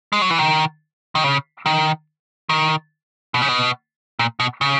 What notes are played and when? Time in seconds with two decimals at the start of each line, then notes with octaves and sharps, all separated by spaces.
0.13 G#3
0.22 F#3
0.31 E3
0.39 D#3
1.15 D#3
1.24 C#3
1.66 D#3
2.49 D#3
3.34 B2
3.42 C#3
3.49 B2
4.19 A#2
4.40 B2
4.61 C#3